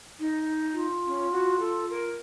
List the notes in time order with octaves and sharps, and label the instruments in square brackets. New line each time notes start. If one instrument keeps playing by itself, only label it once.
[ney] D#4
[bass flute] F4
[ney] C#4
F#4
A4
A#4